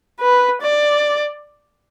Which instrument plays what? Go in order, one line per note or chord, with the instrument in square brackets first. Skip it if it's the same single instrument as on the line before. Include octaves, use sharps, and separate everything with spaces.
[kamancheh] B4
D5